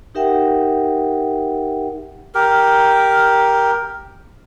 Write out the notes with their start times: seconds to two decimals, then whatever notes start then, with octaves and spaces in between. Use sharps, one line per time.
0.15 D#4 G4 A#4 E5 F#5 G5
2.35 G4 A#4